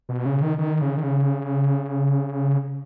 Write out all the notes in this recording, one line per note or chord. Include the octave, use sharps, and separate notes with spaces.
B2
C#3
D#3
D#3
C#3
D#3
C#3